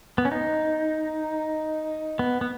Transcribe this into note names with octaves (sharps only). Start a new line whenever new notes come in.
B3
C#4
D#4
B3
B3